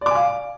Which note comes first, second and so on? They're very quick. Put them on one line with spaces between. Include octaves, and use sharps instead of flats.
D5 D6 G#5 F5